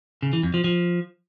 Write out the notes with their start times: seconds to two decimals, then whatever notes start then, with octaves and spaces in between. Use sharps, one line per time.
0.23 C#3
0.33 E3
0.43 F2
0.54 F3
0.64 F3